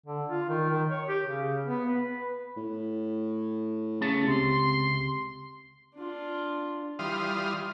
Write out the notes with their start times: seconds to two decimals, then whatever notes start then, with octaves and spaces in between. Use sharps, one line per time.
0.06 D3
0.30 F4
0.49 D#3
0.70 D#3
0.90 C#5
1.08 G4
1.24 C#3
1.65 B3
1.88 B4
2.57 A2
4.01 C#3 A3 B3 A5
4.27 C#2 C3 C6
5.96 D4 F4
6.99 E3 G3 F4 C6 D#6 F6